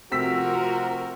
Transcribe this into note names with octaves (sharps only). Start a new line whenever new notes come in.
C3 F3 A3 C4 F#4 A#4 E6 B6